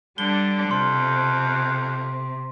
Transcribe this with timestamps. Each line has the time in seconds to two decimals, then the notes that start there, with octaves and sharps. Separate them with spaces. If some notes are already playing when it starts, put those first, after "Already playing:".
0.18 D3 G3 D4 G7
0.71 F2 C3 C6